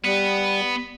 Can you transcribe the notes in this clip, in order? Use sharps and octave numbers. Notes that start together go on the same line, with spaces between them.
G3 B3